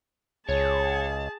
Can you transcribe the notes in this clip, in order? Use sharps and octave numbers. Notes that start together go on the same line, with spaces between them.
C#2 G#4 C#5 A5